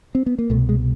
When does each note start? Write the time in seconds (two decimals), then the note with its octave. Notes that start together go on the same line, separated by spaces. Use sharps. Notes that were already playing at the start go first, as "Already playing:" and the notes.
0.15 C4
0.26 B3
0.38 A#3
0.50 C2 B2 A3
0.69 G#3